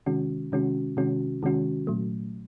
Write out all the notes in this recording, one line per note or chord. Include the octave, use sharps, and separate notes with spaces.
C3 D#3 G#3 C#4 F#4
C3 D#3 G#3 C#4 F#4
C3 D#3 G#3 C#4 F#4
C3 D#3 G#3 C#4 F#4
A#2 F#3 A3